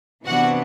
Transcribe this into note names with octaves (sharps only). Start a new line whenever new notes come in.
C3 E3 B3 D4 F#4 F#5